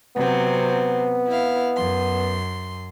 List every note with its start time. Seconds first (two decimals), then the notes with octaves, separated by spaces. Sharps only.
0.16 C3 F#3 B3 C4
1.29 E4 F5
1.76 F#2 C6